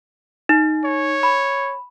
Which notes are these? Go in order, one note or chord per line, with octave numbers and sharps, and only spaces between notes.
D#4
C#5
B5